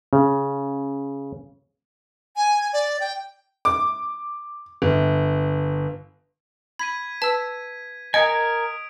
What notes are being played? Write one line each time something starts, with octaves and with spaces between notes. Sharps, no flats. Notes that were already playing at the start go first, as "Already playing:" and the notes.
C#3
G#5
D5
G5
D6
G1
B5 G#6 B6 D#7
B4 A5 E6
A#4 D#5 G#5 D#6 C#7 D7